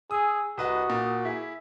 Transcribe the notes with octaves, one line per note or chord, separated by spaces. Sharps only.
G#4 D#6 E6
C2 F#4 B4 D#5 D#6
A#2
E4 G#4 B6